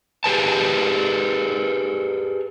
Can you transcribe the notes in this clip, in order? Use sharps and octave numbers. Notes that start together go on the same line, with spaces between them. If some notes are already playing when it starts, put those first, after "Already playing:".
G4 G#4 B4 A5